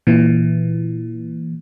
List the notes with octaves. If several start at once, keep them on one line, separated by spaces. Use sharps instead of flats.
A#2 E3